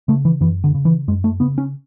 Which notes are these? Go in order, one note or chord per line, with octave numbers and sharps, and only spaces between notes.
C#3 A3
E3
F#2 E3
D3
C#3
E3
F#2 G#3
A3
C#3 B3
C#4